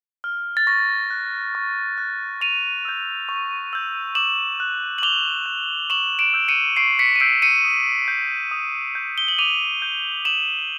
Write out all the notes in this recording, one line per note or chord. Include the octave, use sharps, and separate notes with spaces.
F6
A6
C#6 A#6
F#6
C#6
F#6
C#6 D#7 F7
E6 G6
C#6
E6 G6
D6 E7 F#7
F#6
F#7
D6 F7 G7
F#6
C#6 E7 F#7
D7 E7
E6 G6
C#7 D#7
C#6 C7 D7
B6 C#7
D#7
E6 G6 C7 D7
C#7 D#7
D#6
G6
D#6
G6
G7
F#7
D6 D#7 F7
G6
D6 E7 F#7